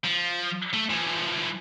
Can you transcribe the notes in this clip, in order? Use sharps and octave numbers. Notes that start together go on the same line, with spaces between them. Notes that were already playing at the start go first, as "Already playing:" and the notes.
F3
A3
E3 F3